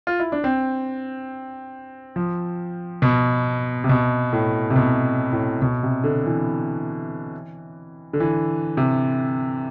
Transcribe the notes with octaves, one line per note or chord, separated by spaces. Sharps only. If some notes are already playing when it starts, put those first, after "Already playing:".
F4
E4
D4
C4
F3
B2
C3
B2
A2
C3
B2
A2
B2
C3
D3
E3
D3
E3
C3